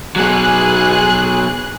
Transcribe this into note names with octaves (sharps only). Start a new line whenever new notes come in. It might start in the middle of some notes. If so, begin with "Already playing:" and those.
B2 F#3 G#4 F#6